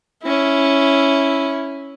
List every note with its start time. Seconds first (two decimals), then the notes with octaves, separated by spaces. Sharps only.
0.24 C#4 E4